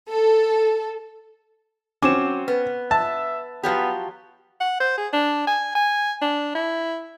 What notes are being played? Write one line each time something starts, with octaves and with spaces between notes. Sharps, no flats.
A4
F#3 C4 C#4 D6 E7
B3 B4
E5 A5
F3 F#3 B3 G4
F#5
C5
G#4
D4
G#5
G#5
D4
E4